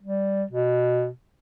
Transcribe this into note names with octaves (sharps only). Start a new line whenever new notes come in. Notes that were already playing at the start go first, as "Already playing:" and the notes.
G3
B2